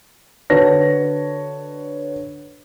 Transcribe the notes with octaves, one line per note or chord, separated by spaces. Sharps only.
D3 F#4 B4 C#5 A5 A#6